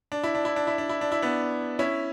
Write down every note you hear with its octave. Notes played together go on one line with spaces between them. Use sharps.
D4
E4
D4
E4
D4
E4
D4
E4
D4
E4
B3 D4
C#4 E4